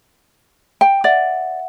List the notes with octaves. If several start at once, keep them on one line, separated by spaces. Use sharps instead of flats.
G5
D5 E5 F#5